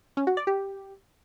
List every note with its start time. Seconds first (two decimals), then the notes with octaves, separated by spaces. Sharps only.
0.17 C#4
0.27 F#4
0.37 D5
0.47 G4